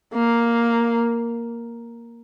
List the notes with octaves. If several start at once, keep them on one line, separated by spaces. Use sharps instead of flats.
A#3